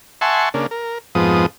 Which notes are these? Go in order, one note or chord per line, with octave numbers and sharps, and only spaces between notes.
E5 F#5 G#5 A5 C6 C#6
C#3 A#3 D4
A#4
F2 G#2 F3 B3 D#6